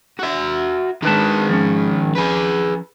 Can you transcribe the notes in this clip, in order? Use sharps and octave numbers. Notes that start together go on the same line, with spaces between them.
F#4 E5
D#3 G#3 D4 B4 A5
F3 C#4
G#4 B4